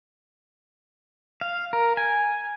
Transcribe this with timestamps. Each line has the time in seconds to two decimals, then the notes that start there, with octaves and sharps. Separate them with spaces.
1.41 F5
1.73 A#4
1.97 G#5